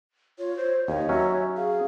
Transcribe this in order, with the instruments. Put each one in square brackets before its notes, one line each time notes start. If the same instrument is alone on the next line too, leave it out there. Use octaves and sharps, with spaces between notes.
[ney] F4 [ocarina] C#5
[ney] C5
[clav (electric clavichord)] D#2 [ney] C#5 [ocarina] D#5
[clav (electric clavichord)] F#3 C#4 [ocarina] E5
[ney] G#4 [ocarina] F5